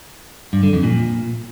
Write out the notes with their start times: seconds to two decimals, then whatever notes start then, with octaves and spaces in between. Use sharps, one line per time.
0.53 G2
0.63 D3
0.73 F2
0.83 A#2